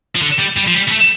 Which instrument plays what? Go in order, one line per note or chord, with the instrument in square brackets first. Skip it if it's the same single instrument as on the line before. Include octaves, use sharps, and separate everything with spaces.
[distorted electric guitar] F3
D3
G3
G3
F3
G3
G3
A3